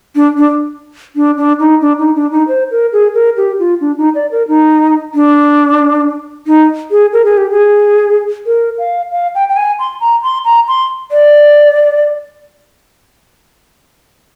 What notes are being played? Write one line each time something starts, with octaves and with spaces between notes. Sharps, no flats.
D4
D4
D4
D4
D#4
D4
D#4
D4
D#4
C5
A#4
G#4
A#4
G4
F4
D4
D#4
D5
A#4
D#4
D4
D#4
G#4
A#4
G#4
G4
G#4
A#4
F5
F5
G5
G5
G#5
C6
A#5
C6
A#5
C6
D5